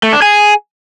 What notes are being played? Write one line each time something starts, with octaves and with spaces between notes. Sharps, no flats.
A3
D4
G#4